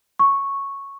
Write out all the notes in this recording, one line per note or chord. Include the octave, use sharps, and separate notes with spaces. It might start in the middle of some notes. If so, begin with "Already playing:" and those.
C#6